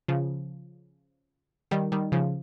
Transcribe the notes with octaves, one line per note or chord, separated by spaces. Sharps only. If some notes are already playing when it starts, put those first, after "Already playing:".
C#3 F3
D#3 G3
D#3 G3
C#3 F3